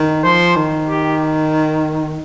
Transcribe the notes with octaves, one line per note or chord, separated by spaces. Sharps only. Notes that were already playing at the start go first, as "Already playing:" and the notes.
Already playing: D#3
F3 C5
D#3
G4